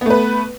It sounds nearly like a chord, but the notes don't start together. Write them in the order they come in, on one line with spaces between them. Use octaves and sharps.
B3 A3 B4